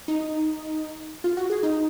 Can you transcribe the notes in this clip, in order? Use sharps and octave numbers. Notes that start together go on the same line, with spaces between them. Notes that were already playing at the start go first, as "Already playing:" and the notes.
D#4
F4
F#4
G#4
D#4